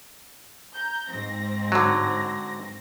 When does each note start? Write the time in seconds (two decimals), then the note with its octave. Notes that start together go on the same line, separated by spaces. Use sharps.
0.75 A#5 G6
1.10 G#2 C4 A#6
1.72 D3 F#3